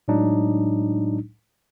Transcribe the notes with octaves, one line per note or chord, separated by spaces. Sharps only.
A2 F#3 G#3 D4 D#4